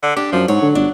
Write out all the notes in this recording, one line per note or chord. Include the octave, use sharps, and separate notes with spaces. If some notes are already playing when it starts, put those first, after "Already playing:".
D3
D4 G4
F#2 F3
G#2 F#3 C#5
D3
G1 D4